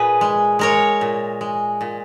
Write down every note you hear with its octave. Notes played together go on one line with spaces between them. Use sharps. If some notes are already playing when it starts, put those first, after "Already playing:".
Already playing: A#2 G#4 B4
G#3
G#3 A#4 C#5
A#2
G#3
A#2